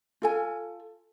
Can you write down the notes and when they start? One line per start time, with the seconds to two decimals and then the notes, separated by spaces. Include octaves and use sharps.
0.22 F4 A4 G#5